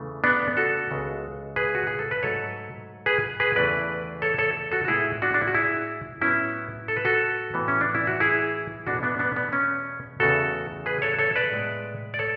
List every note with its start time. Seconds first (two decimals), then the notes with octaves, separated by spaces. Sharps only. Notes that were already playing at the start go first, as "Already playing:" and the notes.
Already playing: E2 C#3 E3 A3
0.24 B3 D4
0.57 F#4 A4
0.91 C#2 C#3 G#3 B3
1.56 G#4 B4
1.75 F#4
1.87 G#4
1.99 A4
2.11 B4
2.23 G#2 F#3 A3 A4 C#5
3.06 G#4 B4
3.40 G#4 B4
3.55 E2 C#3 E3 A3 B4 D5
4.22 A4 C#5
4.38 A4 C#5
4.72 F#4 A4
4.85 F#4
4.88 A2 G#3 B3 E4 G#4
5.22 D4 F#4
5.34 D4
5.41 E4
5.47 F#4
5.54 E4 G#4
6.21 A2 F#3 B3 C#4 E4
6.88 A4
6.96 B4
7.05 F#4 A4
7.54 A2 E3 B3
7.68 C#4
7.81 D4
7.95 E4
8.07 F#4
8.20 E4 G#4
8.86 E2 B2 A3 D4 F#4
9.03 B3 D4
9.19 B3 D4
9.36 B3
9.53 C#4
10.20 E2 C#3 E3 A3 F#4 A4
10.86 G#4 B4
11.02 A4 C#5
11.19 A4 C#5
11.36 B4 D5
11.53 A2 G#3 B3
12.14 D5
12.19 A4 C#5